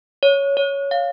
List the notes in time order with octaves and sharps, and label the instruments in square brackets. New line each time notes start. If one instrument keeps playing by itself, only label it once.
[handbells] C#5
C#5
F5